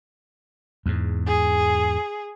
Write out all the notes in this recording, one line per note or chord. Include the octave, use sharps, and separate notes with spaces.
E2 G#2
G#4